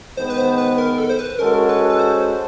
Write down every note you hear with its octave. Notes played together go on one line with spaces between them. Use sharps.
D#3 G#3 B3 C5
B4
C5
B4
A#4
A4
C5
B4
G#3 C#4 F#4 A4 A#4
B4
B4
C5